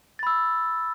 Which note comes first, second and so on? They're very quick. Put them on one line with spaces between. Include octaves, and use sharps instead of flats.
A6 B5 E6